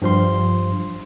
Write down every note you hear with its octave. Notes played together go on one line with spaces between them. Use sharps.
G2 F3 C6